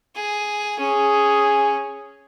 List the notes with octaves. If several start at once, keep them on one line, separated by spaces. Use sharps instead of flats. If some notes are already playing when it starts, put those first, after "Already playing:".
G#4
C#4 G#4